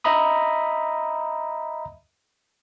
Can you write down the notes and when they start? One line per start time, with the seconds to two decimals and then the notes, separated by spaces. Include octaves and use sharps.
0.04 D#5 E5 A#5 B5 D#6